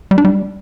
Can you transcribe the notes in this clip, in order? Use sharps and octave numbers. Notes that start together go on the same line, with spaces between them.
G3
D4
G3